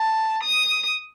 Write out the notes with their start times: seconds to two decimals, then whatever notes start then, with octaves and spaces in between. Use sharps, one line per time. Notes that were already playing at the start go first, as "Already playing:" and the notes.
Already playing: A5
0.43 D#6